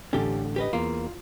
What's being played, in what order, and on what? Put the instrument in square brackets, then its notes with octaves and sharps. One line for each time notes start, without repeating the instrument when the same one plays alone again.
[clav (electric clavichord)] A1 D3 [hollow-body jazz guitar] C#4 G4 A4
[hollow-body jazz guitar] G4 B4 D#5
[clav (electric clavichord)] E2 A#3 [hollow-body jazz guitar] F4